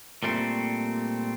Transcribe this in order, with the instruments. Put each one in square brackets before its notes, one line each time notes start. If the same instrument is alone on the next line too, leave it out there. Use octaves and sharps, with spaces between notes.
[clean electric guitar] A#2 G3 A3 C4